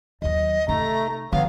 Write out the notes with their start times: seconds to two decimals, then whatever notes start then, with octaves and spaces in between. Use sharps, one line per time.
0.22 D#2 F#3 D#5
0.68 C3 A3 D#4 A#5
1.33 D3 F3 F#3 B3 F5